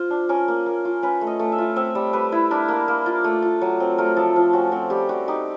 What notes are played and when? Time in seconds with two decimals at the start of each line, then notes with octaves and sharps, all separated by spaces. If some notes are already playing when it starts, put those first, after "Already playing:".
Already playing: F4 C5
0.10 D4
0.29 C#4 A#4
0.48 A#3
0.66 A#3
0.85 F4
1.03 C#4 B4
1.21 A3
1.27 D#5
1.39 A3
1.52 E5
1.58 F4
1.76 C4 E5
1.95 G3
2.13 G3 B4
2.32 E4
2.51 D4 A#4
2.68 A#3
2.88 A#3
3.06 F4
3.24 A3
3.42 F4
3.61 F#3
3.80 C4
3.98 A3 A#4
4.16 F3 A4
4.36 F3 F4
4.53 C#4 F#4
4.72 C4 F#4
4.90 G3 G4
5.09 G3 F#4
5.28 D#4 G4